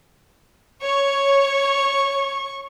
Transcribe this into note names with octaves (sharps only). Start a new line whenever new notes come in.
C#5 C#6